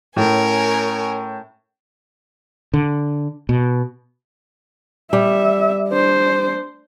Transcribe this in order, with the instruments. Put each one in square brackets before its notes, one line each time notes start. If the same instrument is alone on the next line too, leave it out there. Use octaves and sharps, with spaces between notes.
[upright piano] A2 [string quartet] C#4 A#4 G#5
[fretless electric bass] D3
B2
[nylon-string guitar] G3 [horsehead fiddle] E5
[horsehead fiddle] D4 C5